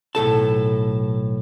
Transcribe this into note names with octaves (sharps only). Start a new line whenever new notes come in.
B1 A2 A4 A5